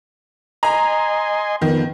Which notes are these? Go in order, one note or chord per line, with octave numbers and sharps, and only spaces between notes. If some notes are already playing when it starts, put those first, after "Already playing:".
D#5 G#5 A#5 C6
F2 D#3 B3